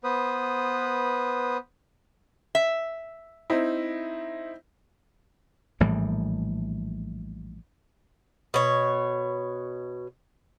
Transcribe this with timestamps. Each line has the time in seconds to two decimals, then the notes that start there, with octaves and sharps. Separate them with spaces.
0.04 B3 B4 C5 D#6
2.55 E5
3.50 C4 D#4 E4
5.80 A#1 A2 E3 G3
8.54 B2 C#5